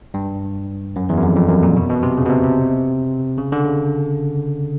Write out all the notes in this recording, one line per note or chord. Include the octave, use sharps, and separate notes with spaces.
G2
F#2
E2
F#2
F2
F2
F#2
A#2
B2
B2
C3
C#3
B2
C3
C3
C#3
D3
C#3